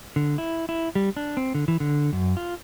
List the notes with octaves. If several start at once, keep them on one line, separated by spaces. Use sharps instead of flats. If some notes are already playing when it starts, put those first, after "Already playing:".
D3
E4
E4
G3
D4
C4
D3
E3
D3
F#2
F4